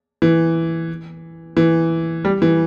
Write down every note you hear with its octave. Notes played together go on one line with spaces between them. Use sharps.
E3
E3
G3
E3